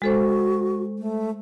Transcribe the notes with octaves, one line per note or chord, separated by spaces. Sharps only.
G#3 F#4 A4 C5
A3